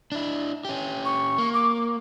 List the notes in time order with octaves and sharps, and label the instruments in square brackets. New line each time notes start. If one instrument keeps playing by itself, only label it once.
[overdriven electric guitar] D4 E4
C#4 G4
[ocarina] C#6
[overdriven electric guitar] A#3
[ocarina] D6